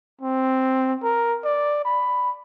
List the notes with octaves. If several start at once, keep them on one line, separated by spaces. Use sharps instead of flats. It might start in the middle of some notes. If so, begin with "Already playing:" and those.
C4
A#4
D5
B5